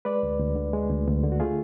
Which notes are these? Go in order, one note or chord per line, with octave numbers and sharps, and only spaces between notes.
G#3 B4 D5
D2
D2
D3
G#3
D2
D2
D3
F#4
A3 F4 G#4